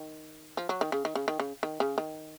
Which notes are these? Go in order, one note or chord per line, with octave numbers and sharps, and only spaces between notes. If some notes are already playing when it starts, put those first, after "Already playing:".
Already playing: D#3
F3
F#3
D#3
C#3
D#3
C#3
D#3
C#3
D#3
C#3
D#3